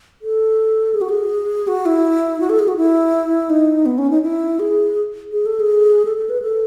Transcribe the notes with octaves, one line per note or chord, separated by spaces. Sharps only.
A4
G#4
F#4
G#4
F#4
E4
F#4
A4
G#4
F#4
E4
D#4
B3
C#4
D#4
E4
G#4
G#4
A4
G#4
A4
A4
B4
A4